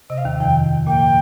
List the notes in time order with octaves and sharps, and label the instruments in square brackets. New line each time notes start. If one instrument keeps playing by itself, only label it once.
[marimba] C3 [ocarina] D#5
[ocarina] F5
[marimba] D#2 D#3
[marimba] F2 F3 [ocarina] G5
[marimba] A#2 A#3 [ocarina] G5